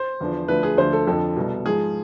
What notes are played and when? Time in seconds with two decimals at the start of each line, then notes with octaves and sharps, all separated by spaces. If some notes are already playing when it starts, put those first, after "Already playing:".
Already playing: C5
0.20 E2 D3 F3
0.48 D2 D3 F3 B4
0.63 G#4
0.78 D2 D3 F3 C5
0.93 A4
1.07 F2 D3 F3 A4
1.36 C2 B2
1.65 G#2 F3 G#4